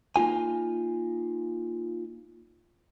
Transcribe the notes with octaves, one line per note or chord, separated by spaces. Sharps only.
A#3 D#4 F4 G#5